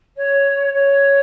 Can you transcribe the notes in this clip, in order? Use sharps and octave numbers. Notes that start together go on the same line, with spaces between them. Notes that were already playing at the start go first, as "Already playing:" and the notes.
C#5
C#5